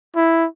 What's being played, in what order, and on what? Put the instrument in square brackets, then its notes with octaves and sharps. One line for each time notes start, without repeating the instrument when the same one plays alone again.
[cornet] E4